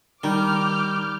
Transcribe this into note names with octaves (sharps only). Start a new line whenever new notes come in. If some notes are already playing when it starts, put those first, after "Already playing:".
D#3 G3 D6 F6 G6